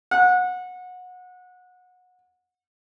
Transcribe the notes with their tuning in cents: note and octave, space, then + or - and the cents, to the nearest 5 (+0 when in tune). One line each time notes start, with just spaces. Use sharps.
F#5 -25